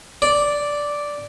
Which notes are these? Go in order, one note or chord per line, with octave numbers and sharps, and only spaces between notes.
D5